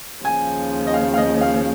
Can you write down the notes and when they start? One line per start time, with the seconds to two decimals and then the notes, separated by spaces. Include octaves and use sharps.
0.25 D#2 C#3 F3 G#5
0.87 D#5
0.94 F5
1.14 F5
1.18 D#5
1.41 F5